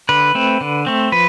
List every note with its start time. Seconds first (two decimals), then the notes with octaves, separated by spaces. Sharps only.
0.09 D3 B4
0.35 A3 C4
0.61 D3
0.87 A3 C4
1.12 F3 B4